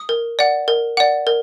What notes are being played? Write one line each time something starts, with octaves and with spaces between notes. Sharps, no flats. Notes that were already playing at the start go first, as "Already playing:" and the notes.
Already playing: D#6
A#4
D5 F#5
A#4
D5 F#5
A#4